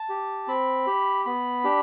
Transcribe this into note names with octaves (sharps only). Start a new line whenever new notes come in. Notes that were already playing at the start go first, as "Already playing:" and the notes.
Already playing: A5
G4
C4 B5
G4
B3 B5
D4 G4